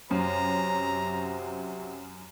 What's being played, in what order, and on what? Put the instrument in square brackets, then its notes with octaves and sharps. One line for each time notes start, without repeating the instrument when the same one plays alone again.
[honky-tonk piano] F#2 [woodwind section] C3 F#3 [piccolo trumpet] A#5